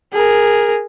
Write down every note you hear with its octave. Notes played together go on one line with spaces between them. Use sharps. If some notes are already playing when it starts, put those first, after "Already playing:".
G#4 A#4